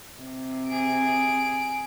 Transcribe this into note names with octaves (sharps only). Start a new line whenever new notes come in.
C3
G#4 D7